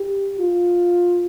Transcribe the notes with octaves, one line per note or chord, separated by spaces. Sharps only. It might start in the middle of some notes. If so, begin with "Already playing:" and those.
Already playing: G4
F4